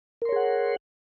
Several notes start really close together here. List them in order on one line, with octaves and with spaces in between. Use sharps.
A#4 C6 C#5 G#4 F#5